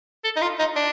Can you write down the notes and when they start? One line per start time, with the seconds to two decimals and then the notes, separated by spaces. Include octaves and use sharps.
0.24 A4
0.36 D#4
0.42 F4
0.59 D#4
0.76 D4